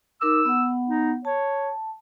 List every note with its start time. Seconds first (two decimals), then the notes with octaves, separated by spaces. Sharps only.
0.21 D#4 A#4 D6 E6
0.45 B3 F#5
0.89 D#4
1.25 C#5 A5